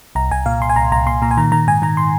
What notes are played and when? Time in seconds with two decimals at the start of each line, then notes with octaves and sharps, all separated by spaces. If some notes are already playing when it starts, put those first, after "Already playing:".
0.15 C2 A#5
0.31 C2 G#5
0.46 A#2 F5
0.61 C2 C6
0.70 G#5
0.76 C2 A#5
0.92 C2 A#5
1.06 A#2 C6
1.22 A#2 A#5
1.31 G#5
1.37 D#3 A#5
1.52 D#3 A#5
1.67 G#2 G#5
1.82 D#3 A#5
1.97 C6